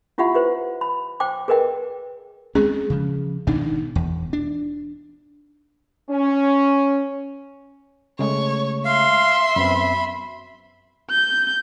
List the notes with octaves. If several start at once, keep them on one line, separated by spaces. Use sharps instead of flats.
E4 F4 G4 E5 F#5 B5
G4 B4 C5
B5
C5 G5 D6
G#4 A#4 B4 D#5 G5
G#3 C4 C#4 G#4
C#3 F3
G#1 B2 D4 D#4
E1 E2
D4
C#4
C#3 G#3 A3 C#5
E5 F5 C6
F#2 B3 C4 B5
G6